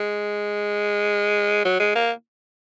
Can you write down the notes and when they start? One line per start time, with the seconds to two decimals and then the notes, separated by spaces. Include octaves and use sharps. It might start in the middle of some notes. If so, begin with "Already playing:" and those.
Already playing: G#3
1.65 F#3
1.80 G#3
1.95 A#3